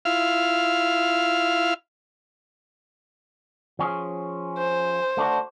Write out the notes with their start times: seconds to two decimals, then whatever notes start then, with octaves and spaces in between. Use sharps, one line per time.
0.05 E4 F4 F5
3.79 F3 C#4 G#4
4.58 C5
5.17 A3 D4 F#4